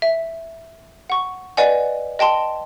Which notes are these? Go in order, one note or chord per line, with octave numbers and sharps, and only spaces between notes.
E5
F#5 C#6
B4 D5 D#5 F#5 G#5
D#5 G5 A5 C6